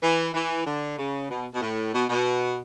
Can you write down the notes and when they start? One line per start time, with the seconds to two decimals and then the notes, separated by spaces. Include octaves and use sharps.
0.02 E3
0.34 E3
0.66 D3
0.98 C#3
1.29 B2
1.54 B2
1.61 A2
1.93 B2
2.09 B2